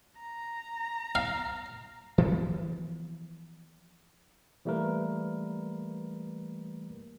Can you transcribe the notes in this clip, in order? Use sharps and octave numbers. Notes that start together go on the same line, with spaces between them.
A#5
F5
E3 F3 B3
E3 G3 A3 A#3 A#4 B4